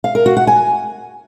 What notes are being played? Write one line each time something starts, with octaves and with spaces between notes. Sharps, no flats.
F5
A#4
F#4
F#5
G#5